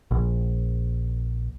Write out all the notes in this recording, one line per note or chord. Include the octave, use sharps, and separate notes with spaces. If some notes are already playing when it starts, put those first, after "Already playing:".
A#1